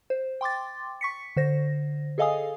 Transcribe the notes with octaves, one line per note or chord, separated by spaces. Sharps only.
C5
G5 C6 D6 A6
C#6 B6 C#7
D3 C5 A#6
G#4 A4 D#5 F5 G#5 D#6